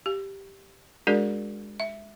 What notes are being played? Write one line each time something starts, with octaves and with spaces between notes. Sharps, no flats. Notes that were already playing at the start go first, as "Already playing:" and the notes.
G4
G#3 D4 F#4 G#4 A#4 D5
E5